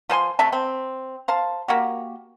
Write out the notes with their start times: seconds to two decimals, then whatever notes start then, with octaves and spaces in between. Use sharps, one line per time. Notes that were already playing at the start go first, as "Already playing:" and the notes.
0.09 F3 C5 G#5 C6
0.39 C3 A3 E5 A5
0.52 C4
1.28 C5 F5 A5
1.68 A#3 F#4 G4